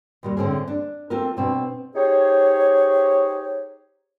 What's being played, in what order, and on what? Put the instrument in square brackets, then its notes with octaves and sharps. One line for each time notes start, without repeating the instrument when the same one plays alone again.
[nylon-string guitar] D#2 A#2 G3
A2 D3 C4 C#4 G#4
D4
C4 F4 A4 A#4
B2 C4 D4
[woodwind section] D#4 G4 G#4 C5 C#5